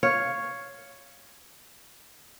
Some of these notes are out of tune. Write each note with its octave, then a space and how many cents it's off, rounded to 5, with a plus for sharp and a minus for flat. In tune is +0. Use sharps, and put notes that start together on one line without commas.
C#5 +0 F5 +0